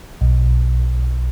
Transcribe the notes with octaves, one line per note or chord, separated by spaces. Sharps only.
B1